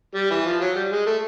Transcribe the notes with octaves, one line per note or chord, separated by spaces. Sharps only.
G3
E3
F3
F#3
G3
G#3
A3